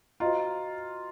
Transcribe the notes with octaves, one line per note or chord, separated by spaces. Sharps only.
F4 F#4 C5 D#5 A#5